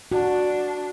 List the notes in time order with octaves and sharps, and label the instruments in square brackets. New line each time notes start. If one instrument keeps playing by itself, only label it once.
[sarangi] D4 [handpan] F#4